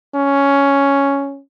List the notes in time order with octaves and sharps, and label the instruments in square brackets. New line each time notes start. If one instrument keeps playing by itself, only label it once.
[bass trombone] C#4